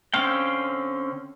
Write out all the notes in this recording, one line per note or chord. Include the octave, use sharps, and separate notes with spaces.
D3 C4 C#4 F5 G5